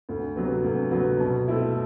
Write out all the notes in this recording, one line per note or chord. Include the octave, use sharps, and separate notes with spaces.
D2
C3 F#3 B3
D2
C3 F#3 B3
B2
A3 C4 E4